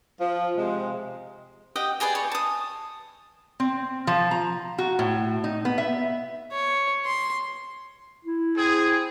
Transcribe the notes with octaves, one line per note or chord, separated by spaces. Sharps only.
F3
C3 G#3
G4 D#5 F#5 G5
G4 G#4 B4 D5
C#5
A5 D#6
C4
F3
A#5
F#4
A2
D#4
B3
E5
C#5
C6
E4
C4 G#4